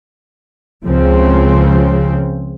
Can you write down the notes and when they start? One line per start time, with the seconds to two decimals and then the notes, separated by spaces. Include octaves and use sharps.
0.84 C#2 C#3 F3 C4